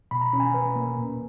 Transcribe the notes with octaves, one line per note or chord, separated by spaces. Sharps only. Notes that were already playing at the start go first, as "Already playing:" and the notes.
B2 B5
A#5
B5
C#4
G#5
B2 B4
A#3
A#2